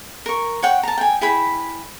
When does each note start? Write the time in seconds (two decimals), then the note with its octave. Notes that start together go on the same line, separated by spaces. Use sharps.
0.26 A#4 C#6
0.62 C#5 F#5 G5
0.83 A5 A#5
0.97 G5 G#5
1.21 E4 G#4 G5 B5